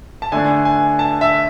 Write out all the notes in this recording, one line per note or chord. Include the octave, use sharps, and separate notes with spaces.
A5
D3 A3 D4 G#5
G#5
A5
E5